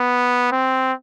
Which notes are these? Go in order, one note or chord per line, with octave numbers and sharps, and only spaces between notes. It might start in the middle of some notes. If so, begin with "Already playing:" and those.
Already playing: B3
C4